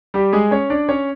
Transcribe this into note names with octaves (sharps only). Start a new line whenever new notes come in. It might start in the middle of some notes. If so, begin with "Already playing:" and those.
G3 G4
G#3 G#4
C#4 C#5
D4 D5
C#4 C#5